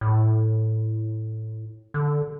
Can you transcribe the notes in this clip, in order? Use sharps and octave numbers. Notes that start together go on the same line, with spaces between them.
A2
D3